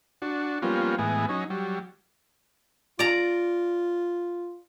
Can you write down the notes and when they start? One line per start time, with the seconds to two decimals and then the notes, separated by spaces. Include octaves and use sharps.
0.22 D4 F#4
0.62 F3 G3 A#3 B3 C#4 F4
0.98 A2 E3 G#3 B3 G#4
1.29 F#3 C#4 D#4
1.50 F#3 G3
2.99 F4 D5 A#5